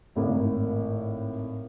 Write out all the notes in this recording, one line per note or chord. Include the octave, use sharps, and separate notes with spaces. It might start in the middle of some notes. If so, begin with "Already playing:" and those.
G#1 A2 A#3